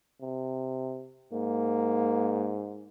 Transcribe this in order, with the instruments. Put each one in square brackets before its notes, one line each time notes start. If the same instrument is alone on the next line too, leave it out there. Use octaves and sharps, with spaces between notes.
[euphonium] C3
[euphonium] G#2 [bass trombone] A#3